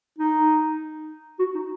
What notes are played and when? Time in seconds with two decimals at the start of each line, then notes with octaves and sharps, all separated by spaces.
0.19 D#4
1.39 F#4
1.55 D#4